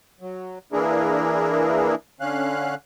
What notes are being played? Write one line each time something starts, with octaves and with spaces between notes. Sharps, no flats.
F#3
E3 A#3 D4 E4 G#4 A#4
D3 C#4 F5 F#6